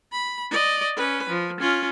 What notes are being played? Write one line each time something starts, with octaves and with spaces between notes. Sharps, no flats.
B5
D5 D#5
C#4 B4
F3
C#4 F4